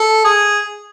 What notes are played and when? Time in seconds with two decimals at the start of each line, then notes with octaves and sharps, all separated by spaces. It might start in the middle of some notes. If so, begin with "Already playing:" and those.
Already playing: A4
0.24 G#4